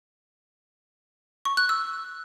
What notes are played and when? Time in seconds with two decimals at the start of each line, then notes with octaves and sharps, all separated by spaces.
1.45 C#6
1.57 F#6
1.69 E6